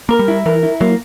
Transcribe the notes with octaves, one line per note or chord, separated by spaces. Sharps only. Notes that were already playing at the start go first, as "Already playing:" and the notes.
A#3 A#4
G3
E4
E3 A#4
E4
F#3 A#3